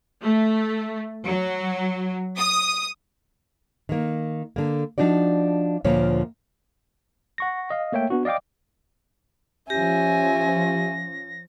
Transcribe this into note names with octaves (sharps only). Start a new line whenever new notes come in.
A3
F#3
D#6
D#3 A#3
D3 A#3
F3 D4 D#4 F#4 D5
D2 A#2 F3 A#3 C#5
F#5 C#6 A#6
D#5 F5
A3 A#3 C#5 E5 G5
B3 D4 F#4
D5 D#5 F5 G5 D6
F3 C#4 G4 E5 G#5 A#6